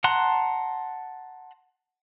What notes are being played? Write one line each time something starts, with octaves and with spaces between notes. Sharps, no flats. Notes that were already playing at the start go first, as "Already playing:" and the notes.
F#5 A5 A#5 C6 F#6